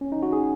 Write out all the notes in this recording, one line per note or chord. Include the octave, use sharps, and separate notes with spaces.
C#4
D#4
F#4
G#4